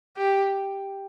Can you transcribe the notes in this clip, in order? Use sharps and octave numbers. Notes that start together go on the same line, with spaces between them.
G4